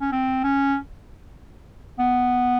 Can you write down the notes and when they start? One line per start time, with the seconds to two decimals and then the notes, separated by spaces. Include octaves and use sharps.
0.01 C#4
0.12 C4
0.44 C#4
1.99 B3